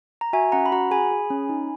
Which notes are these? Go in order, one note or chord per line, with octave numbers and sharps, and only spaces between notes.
A#5
F#4 E5 G#5
C#4 F#5 A#5
B5
F#4 F#5 A#5
G#4 G#5 B5
G#4
C#4
D#4